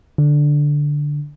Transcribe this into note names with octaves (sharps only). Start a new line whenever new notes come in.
D3